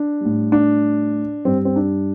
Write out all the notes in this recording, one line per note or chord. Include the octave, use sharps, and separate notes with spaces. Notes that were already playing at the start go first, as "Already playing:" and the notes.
Already playing: D4
A2 G3
D4
G2 G3 C4
C4
D4